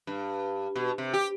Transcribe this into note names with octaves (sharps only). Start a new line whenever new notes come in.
G2
B2
C3
G4